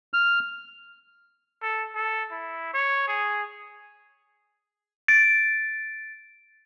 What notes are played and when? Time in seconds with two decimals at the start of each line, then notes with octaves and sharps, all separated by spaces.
0.14 F6
1.63 A4
1.95 A4
2.32 E4
2.74 C#5
3.08 G#4
5.08 A6 D7